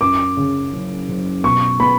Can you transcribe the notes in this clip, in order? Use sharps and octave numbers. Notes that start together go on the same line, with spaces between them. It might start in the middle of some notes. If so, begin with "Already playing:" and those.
F#2 D6
C#3
F#1
F#1
B2 C#6
B3 B5